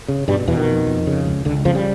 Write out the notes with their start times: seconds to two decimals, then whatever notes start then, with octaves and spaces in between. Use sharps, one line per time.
0.08 C#3
0.28 G2 B2 G3
0.48 E2 B2 E3
0.57 D#3
0.67 F2
0.87 F2
1.07 C#3
1.26 C#2
1.45 C#2 D3
1.65 F2 C#3 F3
1.75 G3